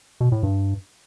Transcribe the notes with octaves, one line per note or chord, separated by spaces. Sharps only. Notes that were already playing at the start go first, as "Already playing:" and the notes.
B2
A2
G2